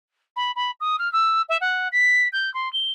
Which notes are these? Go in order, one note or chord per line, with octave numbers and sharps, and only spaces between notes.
B5
B5
D#6
F6
E6
E5
F#5
B6
G6
C6
G7